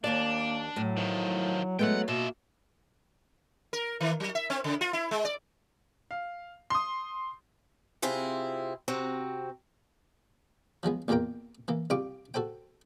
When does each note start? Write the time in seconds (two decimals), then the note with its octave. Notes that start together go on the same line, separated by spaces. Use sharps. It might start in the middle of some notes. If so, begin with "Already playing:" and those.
0.04 D#2 G#2 A#3 D4 D5
0.76 A2 F#3
0.97 D#3 F3
1.79 F#3 G#3 A3 B3 F#5 G5
2.08 B2 A#3 F4 E5
3.73 A#4
4.01 D#3
4.20 F#3
4.35 E5
4.50 C4
4.64 C#3
4.81 F4
4.93 E4
5.11 G#3
5.25 D5
6.11 F5
6.70 C6 D#6
8.02 C3 C4 E4 F4 G#4
8.88 C3 C4 F#4 A#5
10.83 F3 F#3 G#3 B3
11.08 A1 E2 A#2 A#3 A#4 G5
11.68 E3 A#3
11.90 C2 G3 F4 C#6 D6
12.34 F#4 A4 C5 G5